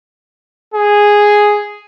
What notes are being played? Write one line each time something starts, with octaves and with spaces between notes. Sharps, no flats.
G#4